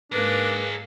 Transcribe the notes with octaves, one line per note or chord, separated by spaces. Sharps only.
G#2 A#3 D4 G#4 A#4 B4